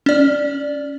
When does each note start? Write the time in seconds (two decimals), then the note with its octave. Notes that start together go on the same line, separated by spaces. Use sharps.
0.06 C#4 D5